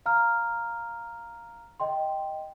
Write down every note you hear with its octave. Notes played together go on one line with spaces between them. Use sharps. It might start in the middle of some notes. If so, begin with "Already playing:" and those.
F5 A#5 F6
D#5 G5 C6